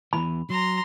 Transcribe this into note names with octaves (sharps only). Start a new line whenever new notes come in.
E2 G2 E3 B5
F#3 A#5 C6